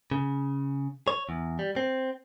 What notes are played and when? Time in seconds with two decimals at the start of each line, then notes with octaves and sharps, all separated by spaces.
0.11 C#3
1.08 C#5
1.29 E2
1.59 G3
1.76 C4